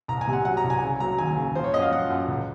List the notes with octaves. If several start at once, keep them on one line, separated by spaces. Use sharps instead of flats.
C2 A#5
G#5
C3
F#5
F#3 F#5
A#5
C2
G#5
C#3
F#3 A#5
D#2 G#5
C#3
F3 C5
C#5
F#2 D#5
F5
F3 F#5
F#2
C#2